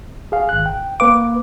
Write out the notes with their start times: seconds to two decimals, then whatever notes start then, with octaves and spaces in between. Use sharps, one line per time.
0.32 G#4 F5
0.49 G#1 F#6
0.66 G5
1.00 A#3 B4 F5 D6